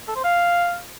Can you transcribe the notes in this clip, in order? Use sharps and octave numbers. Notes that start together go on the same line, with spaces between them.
A4
C5
F5